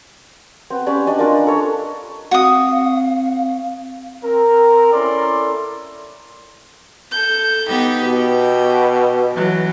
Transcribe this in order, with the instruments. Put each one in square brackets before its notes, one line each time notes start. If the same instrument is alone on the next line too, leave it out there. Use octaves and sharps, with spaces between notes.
[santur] B3 C4
C#4 G4 D5 B5
D4 D5 D#5 G#5
D4 F4 A#4
A4 C#5
[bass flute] C4 [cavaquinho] F#4 D#6 [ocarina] F5
[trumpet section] C4 A#4
C#4 E4 A4 A#4 D5 C6
[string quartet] A4 G6
B3 D#4 G4
[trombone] B2 [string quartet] G4
[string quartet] E3 F#3